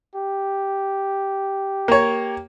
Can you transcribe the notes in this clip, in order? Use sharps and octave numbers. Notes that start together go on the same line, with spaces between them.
G4
A#3 C#5